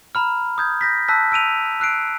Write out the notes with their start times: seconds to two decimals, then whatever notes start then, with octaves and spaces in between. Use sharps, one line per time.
0.15 A#5 B5 F6
0.58 D#6 G6 G#6
0.81 G6 A#6 B6
1.08 A5 E6 F#6 B6
1.32 E6 D7 D#7 F7
1.80 E6 F#6 C7 D7